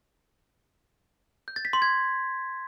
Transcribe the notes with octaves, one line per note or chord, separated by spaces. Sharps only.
G6
A6
B6
C6
G#6